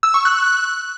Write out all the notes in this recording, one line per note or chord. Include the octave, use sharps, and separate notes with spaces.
E6
C#6
F#6